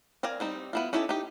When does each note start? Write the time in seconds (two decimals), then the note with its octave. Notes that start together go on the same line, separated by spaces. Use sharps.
0.23 C4 A#4 D5 F5 G#5
0.40 G3 C4 D#4
0.73 B3 E4 F4
0.93 C#4 D#4 E4 G4 A4
1.09 D#4 G4